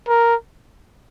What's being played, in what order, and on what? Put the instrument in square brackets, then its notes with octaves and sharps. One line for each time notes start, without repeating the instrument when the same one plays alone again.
[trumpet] A#4